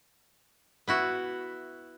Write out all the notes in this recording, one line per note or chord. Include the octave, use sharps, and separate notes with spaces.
B3 E4 F#4